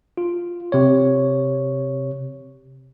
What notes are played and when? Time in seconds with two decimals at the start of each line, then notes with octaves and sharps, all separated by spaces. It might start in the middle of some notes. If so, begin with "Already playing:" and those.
0.17 F4
0.72 C3 C#5